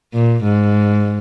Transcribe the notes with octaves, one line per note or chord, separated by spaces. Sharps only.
A#2
G#2